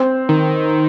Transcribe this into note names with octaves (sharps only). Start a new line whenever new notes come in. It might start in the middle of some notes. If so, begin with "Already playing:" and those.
Already playing: C4
D#3